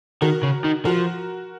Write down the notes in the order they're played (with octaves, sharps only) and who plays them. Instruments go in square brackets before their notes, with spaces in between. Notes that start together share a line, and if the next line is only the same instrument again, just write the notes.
[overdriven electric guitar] D#3 [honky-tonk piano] F#4 A#4
[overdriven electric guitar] C#3
D#3
[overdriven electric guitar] F3 [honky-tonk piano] F#4 A#4